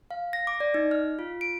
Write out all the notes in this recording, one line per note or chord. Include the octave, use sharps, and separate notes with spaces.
F5
A#6
D6
D5
D#4
F6
F4
D7